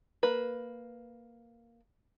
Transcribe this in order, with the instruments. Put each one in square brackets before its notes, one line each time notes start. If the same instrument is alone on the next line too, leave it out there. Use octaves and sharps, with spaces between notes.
[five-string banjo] A#3 B4